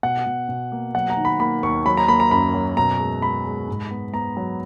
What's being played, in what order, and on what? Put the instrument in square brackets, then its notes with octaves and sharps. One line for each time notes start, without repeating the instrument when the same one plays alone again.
[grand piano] B2 F#5
B2
B2
A#3
F#3 F#5
A#5
D#3
B5
A#3 B5
D#2 C#6
F#3 B5
A#5
A#3 B5
A#5
F#2 B5
F#3
B2 A#5
G#3
G#3 B5
G#3
G#2
B3
B3 A#5
F#3